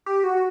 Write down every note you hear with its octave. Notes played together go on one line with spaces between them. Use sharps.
G4
F#4